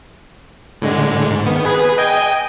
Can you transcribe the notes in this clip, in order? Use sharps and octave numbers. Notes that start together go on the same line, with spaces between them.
A2 D3 G#3
G#2
D#3 B3
G#4 B4
D#5 G5 G#5